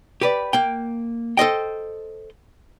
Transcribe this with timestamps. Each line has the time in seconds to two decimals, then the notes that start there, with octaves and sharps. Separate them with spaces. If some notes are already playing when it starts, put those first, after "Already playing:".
0.21 G4 B4 D5
0.53 A#3 G5
1.37 A4 C5 D#5 G5